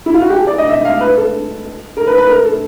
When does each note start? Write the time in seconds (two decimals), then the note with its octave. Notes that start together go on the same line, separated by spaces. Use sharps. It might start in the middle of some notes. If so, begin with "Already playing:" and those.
0.06 E4
0.14 F4
0.22 F#4
0.29 G4
0.37 G#4
0.47 D5
0.58 D#5
0.69 E5
0.85 F5
1.01 B4
1.17 A4
1.97 A#4
2.07 B4
2.18 B4
2.28 A#4
2.45 A4